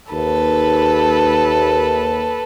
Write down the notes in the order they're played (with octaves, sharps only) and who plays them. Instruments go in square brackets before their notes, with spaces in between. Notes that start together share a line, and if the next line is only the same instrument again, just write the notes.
[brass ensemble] D#2 [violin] A4 B4